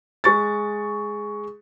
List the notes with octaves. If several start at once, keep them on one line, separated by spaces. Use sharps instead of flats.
G#3 C#6 A6